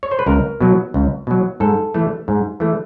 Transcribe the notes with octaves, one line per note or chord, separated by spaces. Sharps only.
C#5
C5
B4
C#2 A#4
B2 F#3
C#2
B2 F#3
G#2 A4
E3 A3
G#2
E3 A3